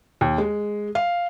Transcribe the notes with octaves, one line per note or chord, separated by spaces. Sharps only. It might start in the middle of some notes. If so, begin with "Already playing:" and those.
D#2
G#3
F5